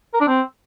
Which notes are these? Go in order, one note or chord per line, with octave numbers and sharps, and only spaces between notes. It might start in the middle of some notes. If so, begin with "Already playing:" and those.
A#4
D4
C4